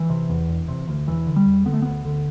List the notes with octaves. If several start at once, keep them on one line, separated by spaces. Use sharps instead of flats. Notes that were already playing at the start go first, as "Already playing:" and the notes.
Already playing: E3
C3
E2
E1
C3
D2
E1 E3
D3
G3
E2
D3 B3
A3
D2 B3
D3